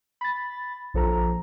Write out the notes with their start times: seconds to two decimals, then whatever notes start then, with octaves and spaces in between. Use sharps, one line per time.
0.21 B5 A6
0.94 A#1 F3 A4 A#5